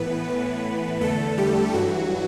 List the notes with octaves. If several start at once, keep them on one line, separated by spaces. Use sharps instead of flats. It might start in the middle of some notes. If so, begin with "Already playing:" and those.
Already playing: A2 E3 B3 B4
A2 E3
E2 D3 A3 A4
G3 G4
G2 E3 F#3 F#4